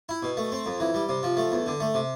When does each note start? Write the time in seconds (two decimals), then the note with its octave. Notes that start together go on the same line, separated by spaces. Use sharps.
0.09 E4
0.23 B2
0.37 A3
0.52 C4
0.66 F2
0.80 E3
0.94 G3
1.09 C3
1.23 F3
1.37 A3
1.52 E2
1.66 D3
1.80 A3
1.94 C3